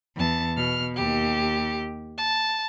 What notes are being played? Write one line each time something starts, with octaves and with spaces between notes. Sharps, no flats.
E2 A5
B2 F6
D#2 G4
A5